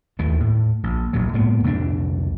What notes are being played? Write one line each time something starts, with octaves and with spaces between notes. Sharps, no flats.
D#2 D#3 E3 A3
A2
A#1
F1 A#1 A#2 F#3
A2 G#3 A#3 B3
C2 F2 A#2 D4